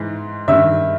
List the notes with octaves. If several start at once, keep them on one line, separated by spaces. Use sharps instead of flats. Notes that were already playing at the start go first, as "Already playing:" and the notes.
Already playing: G#2 E3
G2 D#3 E5